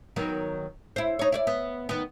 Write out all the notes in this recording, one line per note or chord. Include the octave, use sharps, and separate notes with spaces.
D#3 F#3 B3
E4 C5
D#4 C#5
E4 C#5 D5
B3
D#3 B3